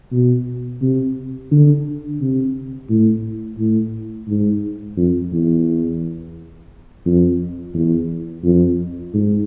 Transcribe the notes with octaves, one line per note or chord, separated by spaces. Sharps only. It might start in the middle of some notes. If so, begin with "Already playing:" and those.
B2
C3
D3
C3
A2
A2
G#2
F2
E2
F2
E2
F2
G#2